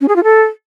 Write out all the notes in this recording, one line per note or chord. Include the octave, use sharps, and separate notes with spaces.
C#4
G#4
F4
A4